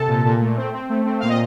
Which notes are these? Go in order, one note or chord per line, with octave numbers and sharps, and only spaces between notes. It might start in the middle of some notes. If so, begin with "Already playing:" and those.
Already playing: C3 A4 A5
A#2
A#2
A3
C4
C4
A3
C4
A#2 F5
D#5